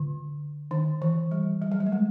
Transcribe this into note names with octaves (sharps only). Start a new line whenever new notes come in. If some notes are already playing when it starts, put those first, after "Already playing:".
Already playing: D3
D#3
E3
G3
G3
F#3
G3
A3
G#3